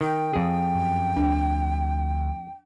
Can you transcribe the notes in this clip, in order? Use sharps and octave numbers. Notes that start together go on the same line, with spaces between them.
D#3 G5
F2 G#4
F#2
D2 D4